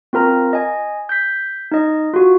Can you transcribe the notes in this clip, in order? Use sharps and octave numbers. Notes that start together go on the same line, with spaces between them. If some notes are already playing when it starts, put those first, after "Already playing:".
C4 F4 A#4 A#5
D#5 G#5
G6 B6
D#4 D#5
F4 F#4